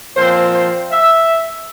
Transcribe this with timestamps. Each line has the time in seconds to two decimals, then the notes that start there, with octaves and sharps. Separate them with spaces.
0.16 A#2 F3 C4 C5
0.54 C5
0.90 E5